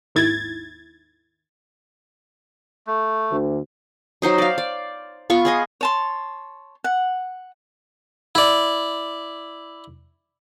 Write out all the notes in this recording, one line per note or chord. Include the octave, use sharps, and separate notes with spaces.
G#1 D#2 D#3 E4 G#6 A6
A3
D2
F#3 D#4 C5 D#5
D5 F5
D5
B3 F4 C#6
G#4 D#5 G#5
C#5 A5 C6
F#5
E4 D5